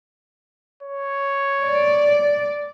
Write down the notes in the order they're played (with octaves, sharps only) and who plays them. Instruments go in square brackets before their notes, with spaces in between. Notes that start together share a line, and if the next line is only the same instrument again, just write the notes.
[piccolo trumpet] C#5
[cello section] D5